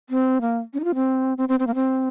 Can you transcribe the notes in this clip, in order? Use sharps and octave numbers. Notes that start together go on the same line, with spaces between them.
C4
A#3
C#4
D#4
F4
C4
C4
C4
C4
A#3
C4